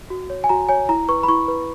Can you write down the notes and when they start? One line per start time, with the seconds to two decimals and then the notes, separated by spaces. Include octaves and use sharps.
0.10 F#4
0.30 C#5
0.44 G#5
0.49 F#4 A#5
0.69 C#5 G#5
0.89 E4 A#5
1.08 B4 C#6
1.23 B5
1.28 E4 C#6
1.48 B4